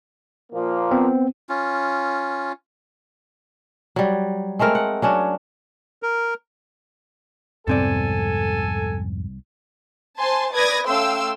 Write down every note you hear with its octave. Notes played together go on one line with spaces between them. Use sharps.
A#2 F3 A#3
B3 C4
C#4 F4
F#3 G3
G#3 A3 C4 A#4
F#5
F#3 C#4 D4
A#4
C2 F2 G#2 B3 C4 A4 D5 G#5
C5 G#5 A5 C6
B4 D5 D#6 G#6 A#6
A3 C#4 F5 G5 C6 E6